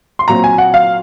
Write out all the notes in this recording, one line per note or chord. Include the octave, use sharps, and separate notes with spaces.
C6
A#2 F#3 C4 A#5
G#5
F#5
F5